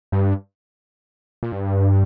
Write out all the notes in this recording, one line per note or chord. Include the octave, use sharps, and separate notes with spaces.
G2
A#2
G2